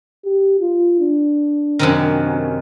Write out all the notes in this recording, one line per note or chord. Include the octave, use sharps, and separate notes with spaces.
G4
F4
D4
F#2 C3 D#3